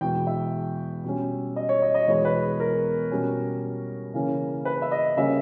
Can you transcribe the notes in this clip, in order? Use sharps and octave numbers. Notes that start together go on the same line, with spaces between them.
E2 B2 G#3 B3 G5
E5
B2 G3 C#4
D#5
C#5
D#5
D#5
E2 B2 G#3 B3 C#5
B4
A#4
B2 G3 C#4
C#3 E3 A#3 C#4
B4
E5
D#5
C#3 G3 A#3 C#4 E5